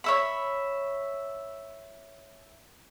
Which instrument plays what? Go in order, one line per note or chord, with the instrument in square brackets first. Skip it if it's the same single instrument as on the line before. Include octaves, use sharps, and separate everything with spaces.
[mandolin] C#5 E5 B5